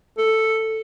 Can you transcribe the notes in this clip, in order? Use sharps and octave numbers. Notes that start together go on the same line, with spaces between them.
A4